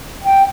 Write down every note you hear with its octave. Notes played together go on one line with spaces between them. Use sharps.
G5